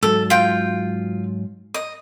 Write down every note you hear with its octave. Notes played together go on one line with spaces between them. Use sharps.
G#2 F#3 A4
F4 G5
D#5